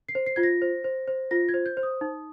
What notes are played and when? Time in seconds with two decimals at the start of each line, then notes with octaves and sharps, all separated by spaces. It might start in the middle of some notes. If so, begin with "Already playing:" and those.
0.09 C7
0.15 C5
0.26 C7
0.36 F4 G#6
0.43 A#6
0.62 C5
0.84 C5
1.08 C5
1.31 F4 A#6
1.49 G#6
1.54 C5
1.66 G6
1.77 C5
1.83 D#6
2.01 D#4